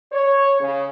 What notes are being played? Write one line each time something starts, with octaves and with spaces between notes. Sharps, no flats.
C#5
C#3